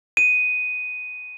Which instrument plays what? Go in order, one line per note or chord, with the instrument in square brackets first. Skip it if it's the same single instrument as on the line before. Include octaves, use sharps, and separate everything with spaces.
[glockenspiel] D#7